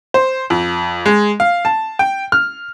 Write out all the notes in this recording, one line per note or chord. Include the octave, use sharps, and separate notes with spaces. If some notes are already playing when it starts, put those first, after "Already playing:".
C5
F2
G#3
F5
A5
G5
F6